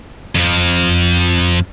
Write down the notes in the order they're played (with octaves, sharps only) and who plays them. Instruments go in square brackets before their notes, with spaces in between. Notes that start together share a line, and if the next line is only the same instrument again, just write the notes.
[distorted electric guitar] F2 F3